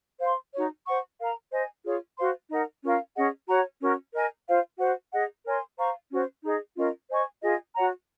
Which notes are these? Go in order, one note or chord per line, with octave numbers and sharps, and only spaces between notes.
C5 F5 C6
D#4 F#4 C#5
C5 F#5 C#6
A#4 F5 A#5
C5 D#5 G#5
F4 G#4 C#5
F#4 C5 F5 C6
D#4 A#4 D#5 F#5
C#4 F4 A#4 F5
C#4 G#4 D#5 F#5
F#4 C#5 F#5 A#5
C#4 F#4 A#4
A#4 D#5 G#5
F4 C5 F5
F#4 C5 F#5
G#4 D#5 F#5
A#4 C#5 G#5 C6
C5 F5 A#5 C#6
C#4 F#4 C5
D#4 G#4 D#5
C#4 F4 A#4 D#5
C5 D#5 G#5 C#6
F4 G#4 D#5 G#5
F#4 C#5 F#5 A#5